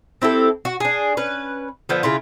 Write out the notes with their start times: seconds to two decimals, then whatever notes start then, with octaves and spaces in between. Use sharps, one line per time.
0.22 C4 E4 G4 A4
0.65 F#4
0.80 D4 G#4
1.17 C#4 B4
1.89 D3 F3 B3
2.03 C#3 E4 F4